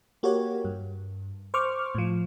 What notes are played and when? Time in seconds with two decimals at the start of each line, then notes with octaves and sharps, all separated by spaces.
0.23 A#3 F#4 G4 A#4 C#5
0.65 G2
1.54 C5 C#6 D6 F6
1.95 A2 F3